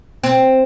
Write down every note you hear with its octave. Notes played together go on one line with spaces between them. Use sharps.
C4